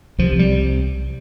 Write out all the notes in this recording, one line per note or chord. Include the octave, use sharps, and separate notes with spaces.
C2 C3 F3
G3